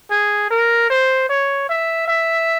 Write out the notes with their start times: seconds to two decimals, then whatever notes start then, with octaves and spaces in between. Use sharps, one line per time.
0.10 G#4
0.50 A#4
0.90 C5
1.29 C#5
1.69 E5
2.08 E5